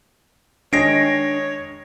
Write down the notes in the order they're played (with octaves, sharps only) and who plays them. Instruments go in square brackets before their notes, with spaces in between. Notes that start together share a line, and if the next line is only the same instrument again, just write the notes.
[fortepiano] D#3 G#3 [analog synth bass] D4 [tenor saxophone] C#5 [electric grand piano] A#6 C7 D7